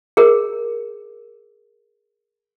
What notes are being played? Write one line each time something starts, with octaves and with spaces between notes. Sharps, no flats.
G#4 A#4